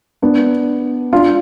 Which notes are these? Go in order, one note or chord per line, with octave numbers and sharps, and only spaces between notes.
B3 D4
D4 F4